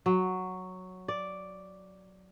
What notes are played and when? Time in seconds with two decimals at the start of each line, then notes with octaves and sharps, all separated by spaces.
0.06 F#3
1.08 D5